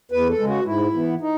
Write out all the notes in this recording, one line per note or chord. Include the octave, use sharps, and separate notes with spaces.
E2 B4
A4
C#3 G#3
F#4
G#2 E4
E3 B3
D#4